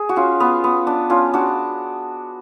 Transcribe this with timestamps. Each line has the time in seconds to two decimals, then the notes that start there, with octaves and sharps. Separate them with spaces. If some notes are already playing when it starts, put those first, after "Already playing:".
Already playing: G#4
0.09 F#4
0.16 C#4 F4
0.40 B3
0.64 B3
0.87 D4
1.10 C#4 F4
1.34 D4 F#4